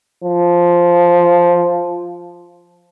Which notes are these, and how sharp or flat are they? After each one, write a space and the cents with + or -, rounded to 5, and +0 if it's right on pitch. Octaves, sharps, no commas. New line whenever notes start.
F3 +0